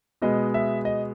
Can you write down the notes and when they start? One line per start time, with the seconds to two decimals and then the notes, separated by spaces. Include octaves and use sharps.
0.22 B2 G#3 B3 D#5
0.54 E5
0.85 D#5